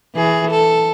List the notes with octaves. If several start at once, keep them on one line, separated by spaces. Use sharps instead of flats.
E3 G#4
A4